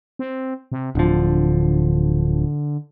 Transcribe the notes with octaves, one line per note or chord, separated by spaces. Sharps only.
C4
C3
D1 D3 F3